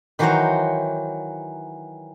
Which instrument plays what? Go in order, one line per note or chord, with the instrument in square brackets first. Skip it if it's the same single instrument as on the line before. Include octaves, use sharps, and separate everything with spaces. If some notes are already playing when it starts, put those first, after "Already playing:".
[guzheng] D#3 E3 F#3 F#4 C5 C#5